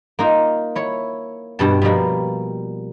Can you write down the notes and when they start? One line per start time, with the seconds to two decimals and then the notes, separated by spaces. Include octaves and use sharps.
0.19 A#3 D#4 F4
0.75 E4 C#5
1.59 G2 B2 A5
1.82 B2 F3 G3 A#3